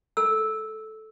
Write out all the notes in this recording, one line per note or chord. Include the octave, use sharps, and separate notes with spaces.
A4 E6